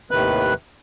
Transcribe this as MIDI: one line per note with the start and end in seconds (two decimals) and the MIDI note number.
0.11 0.53 39
0.11 0.53 45
0.11 0.53 48
0.11 0.53 51
0.11 0.53 71
0.11 0.53 90